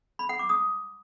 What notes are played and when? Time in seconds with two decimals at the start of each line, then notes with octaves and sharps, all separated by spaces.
0.19 B5
0.29 F#5
0.39 D6
0.49 D#6